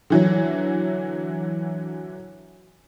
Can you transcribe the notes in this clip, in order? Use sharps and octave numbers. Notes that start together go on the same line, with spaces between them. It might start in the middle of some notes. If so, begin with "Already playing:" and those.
D3 E3 F#3